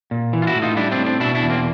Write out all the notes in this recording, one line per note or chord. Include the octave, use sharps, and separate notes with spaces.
A#2
E3
F4
E4 F#4
A2
D#4 F4
G3 D4 E4
C4 D4
A2
C4 D4
B2 D4 E4
D4 E4
E2
A#3 C4